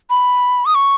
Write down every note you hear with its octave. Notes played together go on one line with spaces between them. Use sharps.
B5
D#6
C#6